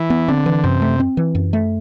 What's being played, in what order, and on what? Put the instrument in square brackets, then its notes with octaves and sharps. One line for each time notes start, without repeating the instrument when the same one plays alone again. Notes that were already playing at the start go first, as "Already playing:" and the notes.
Already playing: [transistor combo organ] E3
[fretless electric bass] B3
[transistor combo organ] D3 [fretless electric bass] C4
[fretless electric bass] E3
[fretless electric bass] F#2 [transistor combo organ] C3
[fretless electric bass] A3
C4
E3
F#2
A3